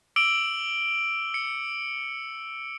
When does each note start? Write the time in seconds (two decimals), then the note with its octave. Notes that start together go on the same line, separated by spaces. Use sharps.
0.16 D6 E6 D7 F#7 G7
1.34 C#7